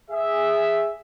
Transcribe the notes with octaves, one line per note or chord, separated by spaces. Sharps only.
G#4 E5